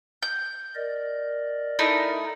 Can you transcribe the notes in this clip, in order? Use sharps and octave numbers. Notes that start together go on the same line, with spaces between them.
G6
A#4 D5 D#5
A3 D#4 E4